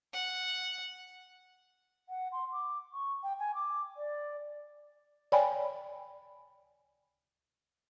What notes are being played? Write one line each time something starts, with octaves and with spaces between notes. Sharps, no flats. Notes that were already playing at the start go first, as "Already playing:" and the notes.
F#5
F#5
C6
D6
C#6
G5
G#5
D6
D5
C#5 D5 G5 G#5 B5